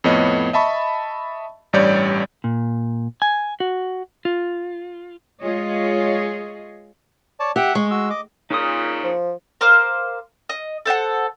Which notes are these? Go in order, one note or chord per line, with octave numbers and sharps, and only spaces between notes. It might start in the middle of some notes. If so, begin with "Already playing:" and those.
F2 A2 B3 C#5 D#5
D#5 E5 A5 B5 C#6
A1 G2 G3 C#5 D5 G6
A#2
G#5
F#4
F4
G#3 F4 G#4 C#5 D#5
C#5 D5 A5
G4 E5 F#5
G#3 C#6
F#4 E6
D#5 D6
A#2 C#3 D#4 D#6
F3
A#4 C5 F5 D6
D#5
A4 C5 D#5 F#5